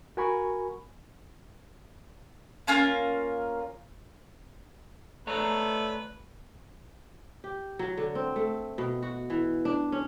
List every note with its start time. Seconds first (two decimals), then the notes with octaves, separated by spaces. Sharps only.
0.17 F#4 A#4 G#5 B5 C#6
2.67 A#3 C#4 F4 A#4
5.27 A3 B4 C#5 D5 A#5
7.44 G4
7.79 F#3
7.97 D3
8.15 C4
8.36 A3
8.78 B2
9.02 F#4
9.30 E3
9.65 D4
9.92 C#4